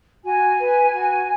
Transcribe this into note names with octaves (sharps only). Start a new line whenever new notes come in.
F#4 G#5
B4
F#4